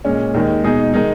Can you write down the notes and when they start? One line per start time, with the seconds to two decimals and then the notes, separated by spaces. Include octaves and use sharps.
0.05 A#2 G#3 C#4
0.34 D#2 D#3 G#3
0.64 B2 G#3 D#4 G#4
0.94 D#3 G#3 D#4